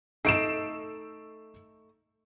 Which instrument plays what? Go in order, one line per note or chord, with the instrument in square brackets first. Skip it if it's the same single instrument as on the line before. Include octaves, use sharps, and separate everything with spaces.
[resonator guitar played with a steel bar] A3 D#4 A4 [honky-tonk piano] C7 D7 E7